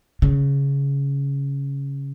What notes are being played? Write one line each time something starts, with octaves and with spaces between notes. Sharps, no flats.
C#3